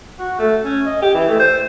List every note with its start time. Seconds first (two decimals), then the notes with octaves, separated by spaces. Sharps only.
0.19 F#4
0.39 A3
0.63 C#4
0.86 D#5
1.02 G4
1.14 E3
1.28 A3
1.40 C5